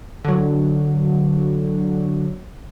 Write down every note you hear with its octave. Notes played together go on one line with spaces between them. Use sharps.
D3 F#3